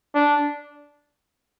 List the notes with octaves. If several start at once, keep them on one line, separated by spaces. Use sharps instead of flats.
D4